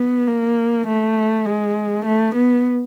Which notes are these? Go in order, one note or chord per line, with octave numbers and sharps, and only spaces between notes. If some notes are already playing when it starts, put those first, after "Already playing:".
Already playing: B3
A#3
A3
G#3
A3
B3